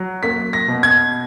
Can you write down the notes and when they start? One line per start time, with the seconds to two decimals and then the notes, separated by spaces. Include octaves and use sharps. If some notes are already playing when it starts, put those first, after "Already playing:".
Already playing: F#3
0.23 A#3 B6
0.53 A#6
0.68 B2
0.83 G#6